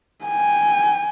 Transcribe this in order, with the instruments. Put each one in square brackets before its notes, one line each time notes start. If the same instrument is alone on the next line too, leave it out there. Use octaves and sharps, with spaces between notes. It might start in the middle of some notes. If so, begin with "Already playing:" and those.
[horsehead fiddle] G5 G#5